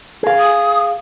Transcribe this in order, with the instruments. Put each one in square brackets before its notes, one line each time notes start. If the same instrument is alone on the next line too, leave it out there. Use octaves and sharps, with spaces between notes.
[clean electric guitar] G#4 F5
[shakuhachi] D#6